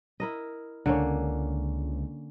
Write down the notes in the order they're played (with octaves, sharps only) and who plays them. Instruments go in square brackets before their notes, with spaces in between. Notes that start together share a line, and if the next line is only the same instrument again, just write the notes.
[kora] E4 A#4 D#5
[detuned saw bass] C#2 [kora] D3 A#3 C#4